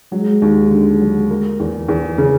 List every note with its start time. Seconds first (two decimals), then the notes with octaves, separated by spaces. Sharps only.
0.12 F#3 G#3
0.42 D#2
0.71 D3
1.01 F#3
1.30 A#3
1.60 E2
1.89 E2
2.18 C#3